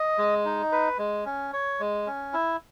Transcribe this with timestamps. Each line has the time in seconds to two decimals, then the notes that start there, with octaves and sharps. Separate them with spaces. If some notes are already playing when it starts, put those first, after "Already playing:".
Already playing: D#5
0.18 G#3
0.45 D#4
0.72 B4
0.99 G#3
1.26 C#4
1.53 C#5
1.80 G#3
2.07 C#4
2.33 E4